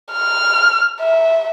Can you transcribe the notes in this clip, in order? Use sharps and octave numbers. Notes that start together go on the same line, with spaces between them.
F6
E5